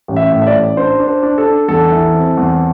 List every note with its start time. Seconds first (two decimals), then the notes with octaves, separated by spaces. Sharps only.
0.08 A1
0.16 E5
0.32 A2
0.42 E5
0.47 D5
0.54 A1
0.77 D4 C5
1.00 D4
1.07 C5
1.23 D4
1.38 A4
1.46 D4
1.68 E2 A4
1.92 E3
2.14 C4
2.37 E2